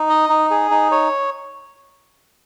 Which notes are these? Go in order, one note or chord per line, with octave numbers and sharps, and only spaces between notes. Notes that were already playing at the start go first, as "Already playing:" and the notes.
Already playing: D#4
D#5
D#4
G#4
D#4
C#5